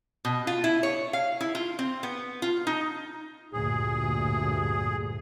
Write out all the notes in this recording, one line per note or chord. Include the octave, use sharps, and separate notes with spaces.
B2
F4
E4
C#5
F5
E4
F4
C4
B3
F4
D#4
D2 G2 A#2 G#4